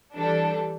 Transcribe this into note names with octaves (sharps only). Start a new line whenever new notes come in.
E3 G3 D4 A4